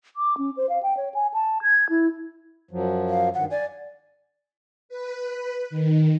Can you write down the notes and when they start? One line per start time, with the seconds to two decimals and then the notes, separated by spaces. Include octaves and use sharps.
0.16 D6
0.38 C#4
0.57 C5
0.69 F5
0.83 G5
0.97 C#5
1.14 G#5
1.34 A5
1.62 G#6
1.89 E4
2.71 F#2 F3 F#3
3.09 F5
3.34 G2 D#3 F#5
3.51 D5 G#5
4.89 B4
5.70 D#3